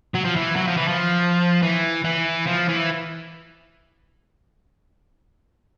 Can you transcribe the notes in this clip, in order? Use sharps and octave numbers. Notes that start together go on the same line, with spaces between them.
F#3
F3
E3
F#3
F3
E3
F3
E3
E3
F3
E3